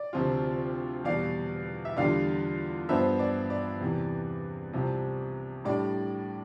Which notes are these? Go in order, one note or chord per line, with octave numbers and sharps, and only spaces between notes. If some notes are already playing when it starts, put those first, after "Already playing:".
Already playing: D5
D2 C3 F3 C4 F4
E2 B2 G3 D5 F5
E5
E2 D3 G3 D4 F4 D5 F5
G2 F3 B3 D4 C5 E5
D5
D5
E2 C3 E3
C2 C3 F3
A2 G3 D4 D5